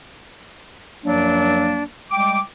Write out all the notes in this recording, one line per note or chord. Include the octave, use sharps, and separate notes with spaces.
F#2 F3 F#3 A#3 D4
G3 G#3 G5 D6